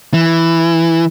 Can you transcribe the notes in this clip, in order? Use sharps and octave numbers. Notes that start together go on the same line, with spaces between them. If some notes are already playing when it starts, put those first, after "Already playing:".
E3